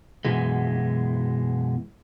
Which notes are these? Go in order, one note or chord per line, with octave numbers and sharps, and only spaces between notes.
F#2 B2 E3 G#3